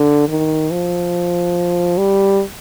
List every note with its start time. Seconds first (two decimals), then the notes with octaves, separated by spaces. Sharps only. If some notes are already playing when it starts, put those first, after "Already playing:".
Already playing: D3
0.29 D#3
0.71 F3
1.98 G3